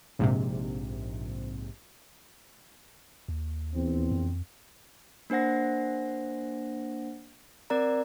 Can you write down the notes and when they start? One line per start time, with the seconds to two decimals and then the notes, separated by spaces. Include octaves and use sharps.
0.19 A#1 G#2 C3
3.28 D#2
3.75 A#1 E2 C4
4.12 F2
5.30 A#3 D4 C5 F#5 A#6
7.70 C4 A#4 D5 A#5